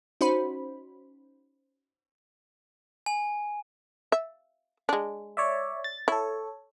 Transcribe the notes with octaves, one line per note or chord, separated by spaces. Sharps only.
C#4 D#4 F#4 C5 B5
G#5
E5
G#3 D4
C#5 D5 E5
A6
E4 A4 C#5